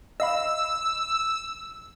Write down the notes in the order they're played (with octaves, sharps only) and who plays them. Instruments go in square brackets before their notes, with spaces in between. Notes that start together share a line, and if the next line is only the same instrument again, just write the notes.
[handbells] D#5 F5 B5 [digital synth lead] E6